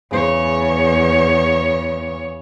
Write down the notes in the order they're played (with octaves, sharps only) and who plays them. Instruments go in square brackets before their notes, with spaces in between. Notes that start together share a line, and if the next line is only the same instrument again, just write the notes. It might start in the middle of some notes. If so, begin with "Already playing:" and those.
[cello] E2 C#5 [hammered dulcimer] C#3